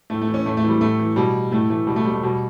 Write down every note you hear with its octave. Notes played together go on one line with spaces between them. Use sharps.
A2 A3
A3
E3
C#4
A2 A3
A3
E3
G3
A2 A3
E3
B2 G3
A2 A3
E3 A3
B2 G3
A3
G3
A3
B2 G3